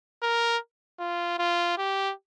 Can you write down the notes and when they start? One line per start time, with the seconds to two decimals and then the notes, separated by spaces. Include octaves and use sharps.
0.23 A#4
1.00 F4
1.39 F4
1.78 G4